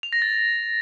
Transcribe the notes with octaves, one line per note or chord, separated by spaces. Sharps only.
F7
A#6
A6